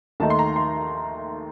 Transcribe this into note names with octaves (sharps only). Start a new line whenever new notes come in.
D#2 D#3 A3 D#4 A5
C6
A#5
C6